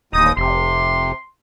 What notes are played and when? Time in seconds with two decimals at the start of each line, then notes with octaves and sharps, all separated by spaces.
0.13 D1 D#2 D#4 D#6
0.37 F1 C3 C6